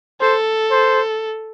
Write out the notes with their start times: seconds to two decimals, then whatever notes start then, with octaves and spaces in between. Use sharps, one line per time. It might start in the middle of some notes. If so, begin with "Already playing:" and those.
0.21 A4 C5
0.71 C5